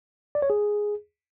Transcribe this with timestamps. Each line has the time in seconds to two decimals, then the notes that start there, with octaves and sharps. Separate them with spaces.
0.35 D5
0.42 C#5
0.50 G#4